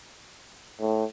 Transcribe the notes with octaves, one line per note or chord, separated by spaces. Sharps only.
A2